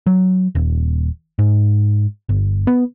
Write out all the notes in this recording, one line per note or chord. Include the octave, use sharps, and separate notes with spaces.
F#3
D#1
G#2
G1
B3